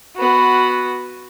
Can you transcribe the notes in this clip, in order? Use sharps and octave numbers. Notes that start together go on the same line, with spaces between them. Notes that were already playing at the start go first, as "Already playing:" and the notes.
B3 F#4